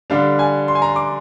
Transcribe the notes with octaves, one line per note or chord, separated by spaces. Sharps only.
D3 G3 D4 F5
G#5
C6
G#5
A#5
C6
D6